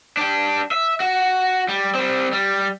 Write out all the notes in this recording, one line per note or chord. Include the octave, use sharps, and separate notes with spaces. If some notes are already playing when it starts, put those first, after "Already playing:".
D4 G4
E5
F#4
G3
G3 C4
G3